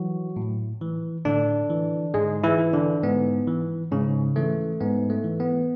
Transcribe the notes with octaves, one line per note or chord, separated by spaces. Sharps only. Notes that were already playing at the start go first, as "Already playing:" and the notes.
Already playing: E3 F#3 F#4
A2
E3
A2 D3 D4
E3
G#2 G#3 G#4
E3 E4
E3
D3 D4
G#2 B3
E3
G#2 C#3 C#4
E3 A3
G#2 B3
A3
E3
B3